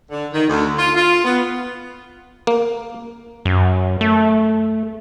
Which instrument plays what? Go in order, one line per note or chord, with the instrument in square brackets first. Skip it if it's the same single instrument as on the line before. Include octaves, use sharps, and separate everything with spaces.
[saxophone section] D3
D#3
D2
F4
F4
B3
[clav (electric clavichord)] A#3
[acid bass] F#2
A3